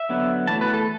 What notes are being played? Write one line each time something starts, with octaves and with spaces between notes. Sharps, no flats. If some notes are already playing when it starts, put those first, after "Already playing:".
Already playing: E5
D3 F#3 B3
E3 A3 A5
B4
A4